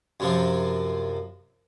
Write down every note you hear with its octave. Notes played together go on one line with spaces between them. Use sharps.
F#2 C3 F3